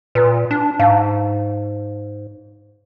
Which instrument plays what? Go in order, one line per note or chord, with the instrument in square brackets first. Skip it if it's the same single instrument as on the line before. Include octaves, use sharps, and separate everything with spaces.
[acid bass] A#2 [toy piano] B4 A#5
[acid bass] D4
[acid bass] G#2 [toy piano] F5 A5